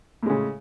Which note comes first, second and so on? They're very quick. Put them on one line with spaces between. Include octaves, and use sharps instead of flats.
A2 G#3 C#3